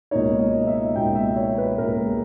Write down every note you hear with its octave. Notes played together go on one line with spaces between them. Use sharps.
C#2 B2 A#3 D#4 C#5
D#5
E5
C#2 B2 A#3 D#4 G5
E5
C#5
B4
C#2 B2 A#3 D#4 A#4
G#4